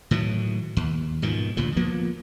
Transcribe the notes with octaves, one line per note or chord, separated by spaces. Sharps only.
A2 D#3 E3 F#3
D#2
G#2 B2 D#3 F3
D2 A#2 C#3 F3
F3 A#3 B3